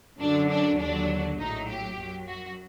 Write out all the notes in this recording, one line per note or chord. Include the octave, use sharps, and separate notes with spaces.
F#2 D3 F#3 D4
D4
D#2 D3 F#3 D4
A#1 A2 F#3 D#4
G4
F#2 F#3
F#4